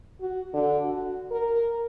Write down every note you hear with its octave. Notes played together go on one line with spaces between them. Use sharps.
F#4
D3
F#4
A#4